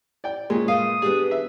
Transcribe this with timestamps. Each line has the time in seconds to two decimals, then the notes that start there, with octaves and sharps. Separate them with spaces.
0.24 D5 G5
0.50 A#2 G#3 C#4
0.68 A3 A#4 F5 D#6
1.02 G3 B3 D4 G#4
1.31 E5